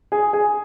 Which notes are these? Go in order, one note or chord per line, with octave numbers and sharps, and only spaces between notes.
G#4
G#4